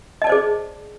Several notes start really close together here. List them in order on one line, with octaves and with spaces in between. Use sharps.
D#5 A5 D5 C5 G#4